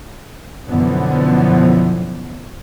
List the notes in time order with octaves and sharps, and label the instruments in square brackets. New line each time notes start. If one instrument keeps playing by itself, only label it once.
[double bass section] F#2 B2 D3 E3 F3 B3